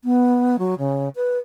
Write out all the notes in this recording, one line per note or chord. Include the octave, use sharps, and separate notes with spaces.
B3
F#3
C#3
B4